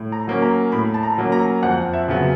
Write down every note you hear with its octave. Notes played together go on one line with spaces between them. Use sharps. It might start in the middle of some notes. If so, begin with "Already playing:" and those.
Already playing: A2
A#5
F#3 A#3 C#4
A#5
A2 B5
A5
A#5
F#3 A#3 C#4
A#5
F2 F#5
E5
C#3 F#3 B3